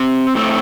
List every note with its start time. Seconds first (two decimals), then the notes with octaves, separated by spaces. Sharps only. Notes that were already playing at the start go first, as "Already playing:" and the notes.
Already playing: C3 C4
0.35 A2 A3 C4